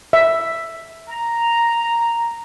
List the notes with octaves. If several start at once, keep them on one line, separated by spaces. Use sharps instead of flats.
E5
A#5